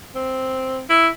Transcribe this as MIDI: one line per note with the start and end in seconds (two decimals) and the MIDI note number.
0.15 0.79 60
0.90 1.08 64